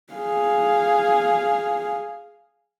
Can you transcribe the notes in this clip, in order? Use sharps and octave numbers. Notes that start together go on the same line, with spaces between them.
G#4 F5